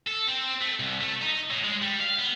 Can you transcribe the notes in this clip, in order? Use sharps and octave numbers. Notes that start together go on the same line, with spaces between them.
A4
C4
A3
C2
A3
D#4
A2
G#3
G3
F5
B3